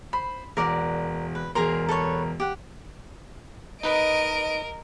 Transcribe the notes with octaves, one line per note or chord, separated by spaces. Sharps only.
C5 B5
E1 A#4 D5 F#5
B4
E1 G#4 A#4 A#5 C6
A4 B4 C#5
G4 F#5
D#4 A#4 B4 D#5 D7